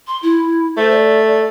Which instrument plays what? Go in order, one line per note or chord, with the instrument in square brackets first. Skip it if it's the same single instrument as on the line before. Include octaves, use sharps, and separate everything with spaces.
[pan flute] C6
E4
[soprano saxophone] A3 [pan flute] C5
[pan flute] D5